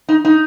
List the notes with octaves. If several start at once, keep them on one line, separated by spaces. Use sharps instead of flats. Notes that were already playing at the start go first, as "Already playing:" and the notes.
D#4
D#4